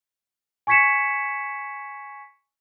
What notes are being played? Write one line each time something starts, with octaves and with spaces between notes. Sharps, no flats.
G#5 C#6 G#6 B6 C#7 E7